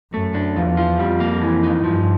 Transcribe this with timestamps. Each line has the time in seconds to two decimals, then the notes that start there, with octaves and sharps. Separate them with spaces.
0.13 F#2 A3
0.34 D4
0.56 E2 F3
0.77 F4
0.99 F2 G3
1.20 A#3
1.42 E3
1.63 D#4
1.84 G2 F3